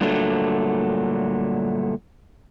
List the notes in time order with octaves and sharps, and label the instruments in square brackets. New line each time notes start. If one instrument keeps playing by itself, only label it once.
[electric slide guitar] G2 A#2 D3 F#3 A3